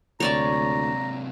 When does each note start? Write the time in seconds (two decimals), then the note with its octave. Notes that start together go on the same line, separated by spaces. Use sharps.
0.20 D2 C3 F#3 C#5 D5 A5 A#5